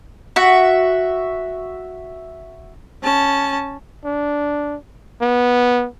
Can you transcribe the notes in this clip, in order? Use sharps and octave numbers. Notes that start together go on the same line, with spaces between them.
F#4 E5
C#4 A5
D4
B3